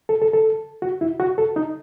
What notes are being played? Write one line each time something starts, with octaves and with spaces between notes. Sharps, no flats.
A4
A4
A4
F#4
E4
F#4
A4
D#4